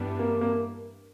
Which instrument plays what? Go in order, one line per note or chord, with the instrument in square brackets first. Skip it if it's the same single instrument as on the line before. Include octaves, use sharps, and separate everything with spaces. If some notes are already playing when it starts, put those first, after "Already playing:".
Already playing: [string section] G2 E3 G3 B3 D4
[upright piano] A#3
A#3